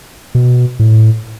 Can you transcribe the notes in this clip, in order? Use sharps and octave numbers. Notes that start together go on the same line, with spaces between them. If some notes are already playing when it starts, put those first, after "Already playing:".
B2
A2